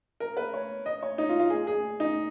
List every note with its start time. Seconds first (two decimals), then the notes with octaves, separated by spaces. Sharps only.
0.20 A#4
0.37 B4
0.54 C#5
0.86 D#5
1.03 C#5
1.18 D#4
1.29 F4
1.40 F4
1.50 G#4
1.67 G#4
2.00 D#4